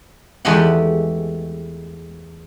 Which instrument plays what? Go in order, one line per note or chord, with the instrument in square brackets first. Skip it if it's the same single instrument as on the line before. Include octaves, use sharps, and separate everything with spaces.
[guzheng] E2 G#3 A3 G4 D#5 F#5